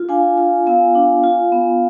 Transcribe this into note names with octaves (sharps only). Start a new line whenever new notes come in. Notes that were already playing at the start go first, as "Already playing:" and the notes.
Already playing: F4
D4 F5 G#5
F4
B3 F5 G#5
D4
F4
B3